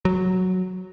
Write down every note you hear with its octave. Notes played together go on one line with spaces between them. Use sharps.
F#3